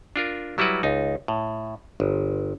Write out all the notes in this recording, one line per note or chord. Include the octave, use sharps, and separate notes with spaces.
D4 F4 A#4
F#3 G3 E4 F#4 B4
C#2 D#4
A2
G1